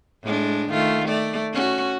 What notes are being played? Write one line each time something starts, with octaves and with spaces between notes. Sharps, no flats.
A2 G#3 D4
D#3 A3 F4
A3 D5
C#4 F#4